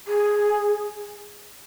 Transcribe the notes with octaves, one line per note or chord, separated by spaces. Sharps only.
G#4